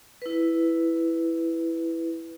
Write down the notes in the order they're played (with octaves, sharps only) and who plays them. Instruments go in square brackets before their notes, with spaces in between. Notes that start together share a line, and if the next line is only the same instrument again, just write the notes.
[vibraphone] E4 B4